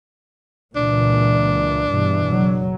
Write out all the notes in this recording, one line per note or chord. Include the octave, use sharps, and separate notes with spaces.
C#2 A#2 E3 D4
G2 B2 E3
F#1 F#3